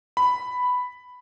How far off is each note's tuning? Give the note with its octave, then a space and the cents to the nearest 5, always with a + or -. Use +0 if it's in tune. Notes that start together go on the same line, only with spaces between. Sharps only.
B5 +5